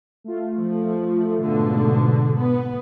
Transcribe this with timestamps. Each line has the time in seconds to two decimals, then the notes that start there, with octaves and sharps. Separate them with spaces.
0.24 A3 F4
0.57 F3
1.43 G#2 B2 D3
2.39 B3